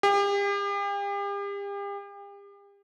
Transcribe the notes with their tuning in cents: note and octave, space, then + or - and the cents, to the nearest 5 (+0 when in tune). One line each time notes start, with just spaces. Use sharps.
G4 +40